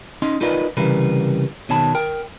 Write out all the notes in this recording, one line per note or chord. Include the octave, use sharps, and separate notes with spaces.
C#4 D#4 D#5 C6
D#4 F4 A#4 B4 D5 D#5
C2 C#3 E3 G3 A#4 B4
B2 D#3 C#5 A5 B5
A#4 G5